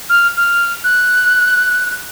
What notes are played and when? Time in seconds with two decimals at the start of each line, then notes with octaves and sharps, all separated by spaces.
0.09 F6
0.37 F6
0.84 F#6